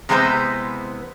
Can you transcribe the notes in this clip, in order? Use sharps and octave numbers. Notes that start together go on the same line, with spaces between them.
C3 E3 G#3 B3 B4 C5